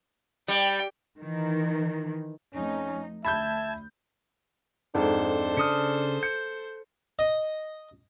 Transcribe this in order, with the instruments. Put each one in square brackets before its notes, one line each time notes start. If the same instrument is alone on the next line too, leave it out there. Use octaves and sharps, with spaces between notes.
[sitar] G3 [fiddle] G5
[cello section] D#3 E3
[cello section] F2 A3 D#4 [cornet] C#4
[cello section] D2 [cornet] E5 [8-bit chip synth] A5 G#6 [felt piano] B5 G6
[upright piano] F2 G#2 [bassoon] D4 [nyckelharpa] A4 C5
[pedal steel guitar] C#3 F6 [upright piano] D#6 C#7
[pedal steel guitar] G6 [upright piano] C#7
[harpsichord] D#5